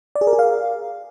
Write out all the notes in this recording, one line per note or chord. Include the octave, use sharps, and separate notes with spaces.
D5
G#4
A#4
G#4
F5